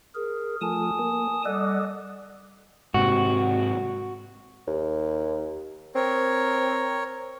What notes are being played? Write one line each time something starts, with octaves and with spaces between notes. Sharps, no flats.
G#4 A#4
F3 A3 G#5 A5 D#6
A#3
G3 A4 D5 D#5 F#5
G#2 C3 F#4
D#2
C4 A#4 C#5